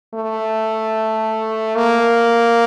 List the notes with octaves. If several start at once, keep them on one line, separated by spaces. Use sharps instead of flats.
A3
A#3